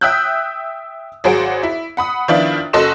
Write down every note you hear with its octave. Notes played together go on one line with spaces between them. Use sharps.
E5 G5 D#6 E6 F#6 G6
G#1 F#3 G#4 C5 F#5 D7
E4
F#5 B5 D#6
D#3 F3 B3 D4 E4 F4
F#1 F#4 A4 D#5 C6 E7